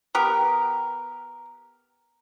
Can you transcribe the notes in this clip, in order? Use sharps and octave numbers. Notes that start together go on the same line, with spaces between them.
B3 G4 A#4